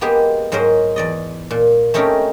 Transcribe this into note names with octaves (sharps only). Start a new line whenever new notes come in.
G#3 A#3 B3 G4 G#4
G#2 F#3 G#4 A#4 C5
E2 D5 D#5
A#2
A3 C4 C#4 D#4 G4 A#4